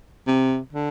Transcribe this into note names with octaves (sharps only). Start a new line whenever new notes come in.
C3
D3